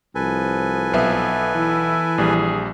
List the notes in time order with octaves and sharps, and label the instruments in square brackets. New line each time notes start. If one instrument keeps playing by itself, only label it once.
[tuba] C2 [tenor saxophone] F3 [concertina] A4 B4 G#5
[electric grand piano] B1 B3 E5
[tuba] E3 [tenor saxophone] E4
[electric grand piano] A#1 G3 [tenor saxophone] G#4